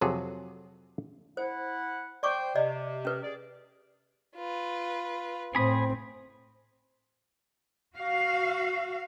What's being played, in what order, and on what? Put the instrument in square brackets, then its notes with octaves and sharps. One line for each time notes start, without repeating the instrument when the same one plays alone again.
[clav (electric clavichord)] F2 C3 F#3 G#4 A4
[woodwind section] E4 F#5 [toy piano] C5
[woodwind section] C5 G5 [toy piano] D5 C#6 D6
[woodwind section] C3 [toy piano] D5 D#5
[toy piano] C#4 B4
[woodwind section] G#4 D5
[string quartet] F4 B4
[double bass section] A2 C4 [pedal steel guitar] G#4 B5 D#6
[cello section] F#4 F5